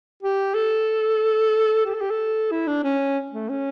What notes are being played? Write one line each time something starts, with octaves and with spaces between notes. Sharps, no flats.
G4
A4
G4
A4
G4
A4
E4
D4
C#4
A3
C#4